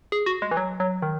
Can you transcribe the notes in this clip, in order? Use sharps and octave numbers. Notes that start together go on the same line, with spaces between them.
G#4
F#4
G#3
E3
F#3
F#3
D#3